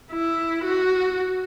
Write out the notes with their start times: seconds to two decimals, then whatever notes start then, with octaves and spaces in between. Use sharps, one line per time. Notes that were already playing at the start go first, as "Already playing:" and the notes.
0.12 E4
0.64 F#4